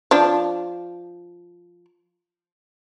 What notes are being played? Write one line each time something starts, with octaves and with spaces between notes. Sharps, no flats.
F3 D4